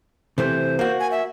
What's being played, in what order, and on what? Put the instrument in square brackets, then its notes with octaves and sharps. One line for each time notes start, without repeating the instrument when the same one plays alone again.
[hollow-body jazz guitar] C3 E3 A3 [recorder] C5
[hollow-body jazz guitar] A#3 F#4
[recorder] G#5
E5